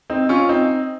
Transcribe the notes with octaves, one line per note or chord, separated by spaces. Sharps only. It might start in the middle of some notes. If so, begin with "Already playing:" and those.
C4 D#4
C#4 F4
C4 D#4